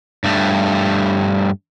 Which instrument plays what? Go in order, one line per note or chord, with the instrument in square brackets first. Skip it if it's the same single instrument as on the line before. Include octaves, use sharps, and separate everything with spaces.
[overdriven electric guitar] G2 A3